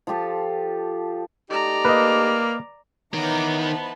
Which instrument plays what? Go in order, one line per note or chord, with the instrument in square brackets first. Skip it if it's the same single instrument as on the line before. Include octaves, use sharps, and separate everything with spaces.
[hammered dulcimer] F3 F4 G4 A4
[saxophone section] A3 D#4 G4 [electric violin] D5 A#5
[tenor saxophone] A#3 [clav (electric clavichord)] B4 D#5
[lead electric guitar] D#3 [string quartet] E3 B3 D#4 [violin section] C#5 A#5 D6
[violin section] C5 A5 B5